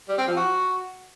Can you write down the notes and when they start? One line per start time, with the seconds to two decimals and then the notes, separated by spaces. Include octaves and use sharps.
0.08 G3
0.18 C4
0.27 F3
0.37 F#4